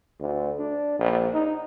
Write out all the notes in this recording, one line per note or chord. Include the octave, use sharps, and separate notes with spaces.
D2
D4
A#1
D#4